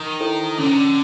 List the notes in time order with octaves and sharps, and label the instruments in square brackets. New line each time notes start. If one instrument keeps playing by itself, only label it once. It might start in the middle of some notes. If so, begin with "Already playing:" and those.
Already playing: [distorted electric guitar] D#3
[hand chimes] E4 A4 C5
[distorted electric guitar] D3 [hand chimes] C#4
[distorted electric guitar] D#3
D3